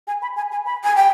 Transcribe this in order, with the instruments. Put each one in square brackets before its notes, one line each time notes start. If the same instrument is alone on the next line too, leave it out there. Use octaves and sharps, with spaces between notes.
[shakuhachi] G#5
B5
G#5
G#5
B5
G#5
G5